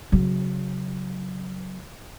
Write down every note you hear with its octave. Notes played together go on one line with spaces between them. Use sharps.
C#3 F#3